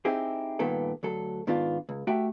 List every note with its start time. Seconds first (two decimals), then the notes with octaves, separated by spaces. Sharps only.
0.05 C4 D#4 E4 G4 G#4
0.59 G2 A#2 D#3 B3 G4 A4
1.03 D2 F#3 A4
1.47 G#2 D#3 B3 D4 F4
1.89 C#2
2.07 A3 F#4 G4 E5 G5